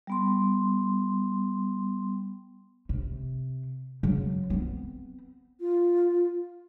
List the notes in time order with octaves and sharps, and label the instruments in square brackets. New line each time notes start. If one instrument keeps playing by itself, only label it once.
[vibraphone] G3 B3 C6
[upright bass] C3
C#3 F#3
B3 C4
[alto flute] F4